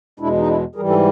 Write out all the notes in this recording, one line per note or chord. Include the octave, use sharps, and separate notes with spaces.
E2 B2 G#3 D4 E4
D#4
D4 E4
G#2 E3 G3 G#4 A#4
G4 A4